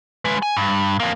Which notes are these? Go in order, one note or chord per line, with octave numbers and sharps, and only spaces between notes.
G#3 B4
G#5
G2
F2 A#3